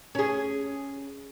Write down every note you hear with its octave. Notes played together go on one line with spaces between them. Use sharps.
C#4 G#4